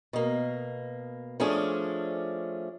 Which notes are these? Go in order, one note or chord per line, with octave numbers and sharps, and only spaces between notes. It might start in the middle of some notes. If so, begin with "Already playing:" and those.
B2 A#3
F3 A3 C#4 D4 G#4